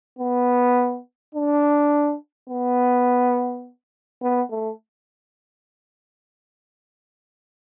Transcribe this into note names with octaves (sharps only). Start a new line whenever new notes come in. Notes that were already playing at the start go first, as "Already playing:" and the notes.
B3
D4
B3
B3
A3